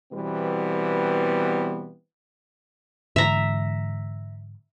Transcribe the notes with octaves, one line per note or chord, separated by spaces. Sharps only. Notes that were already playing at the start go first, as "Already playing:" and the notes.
B2 E3 G3 B3 C4
G#2 D3 E3 E5 A#5